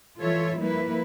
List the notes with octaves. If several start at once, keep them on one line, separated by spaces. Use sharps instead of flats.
E3 F4 A4 C#5 E5
F3 G3 A#3 E4 B4